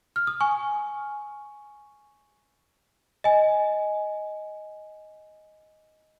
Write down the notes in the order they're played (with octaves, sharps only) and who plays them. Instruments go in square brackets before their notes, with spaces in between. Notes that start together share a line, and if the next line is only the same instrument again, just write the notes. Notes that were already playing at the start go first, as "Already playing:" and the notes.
[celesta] F6
D#6
G#5 C#6
D#5 G#5